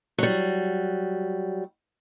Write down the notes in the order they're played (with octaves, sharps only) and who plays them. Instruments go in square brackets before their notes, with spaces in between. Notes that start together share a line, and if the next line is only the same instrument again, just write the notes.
[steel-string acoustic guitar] F#3 G3